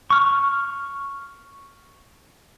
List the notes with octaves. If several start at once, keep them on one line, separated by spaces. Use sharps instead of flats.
C#6 F6